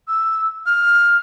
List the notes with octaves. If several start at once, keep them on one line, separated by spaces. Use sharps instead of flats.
E6
F6